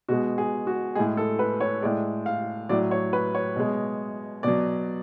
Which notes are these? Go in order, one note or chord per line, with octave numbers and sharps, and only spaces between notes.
B2 G#3 F#4
G#4
F#4
A2 G#3 G#4
A4
B4
C#5
A2 G#3 D5
F5
A2 F#3 D5
C#5
B4
C#5
B2 G#3
B2 F#3 D5